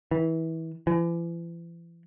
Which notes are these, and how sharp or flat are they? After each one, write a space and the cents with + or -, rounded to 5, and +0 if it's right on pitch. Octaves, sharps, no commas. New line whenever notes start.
E3 -25
E3 +40